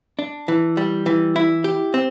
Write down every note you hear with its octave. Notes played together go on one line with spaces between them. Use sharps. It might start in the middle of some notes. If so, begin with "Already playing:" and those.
D4
E3
G3
E3
E4
G4
C4